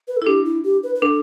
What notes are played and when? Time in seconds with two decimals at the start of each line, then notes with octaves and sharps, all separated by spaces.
0.08 B4
0.17 A4
0.22 E4
0.27 D4 G4
0.45 E4
0.64 G4
0.83 B4
0.95 B4
1.02 D4 A4